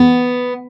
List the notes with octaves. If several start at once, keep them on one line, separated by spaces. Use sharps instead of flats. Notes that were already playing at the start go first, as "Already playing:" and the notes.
Already playing: B3